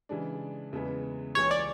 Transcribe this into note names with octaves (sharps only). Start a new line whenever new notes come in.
C#3 E3 G#3 D4
E2 C#3 E3 G#3 B3
C#2 C#3 E3 C#5
D5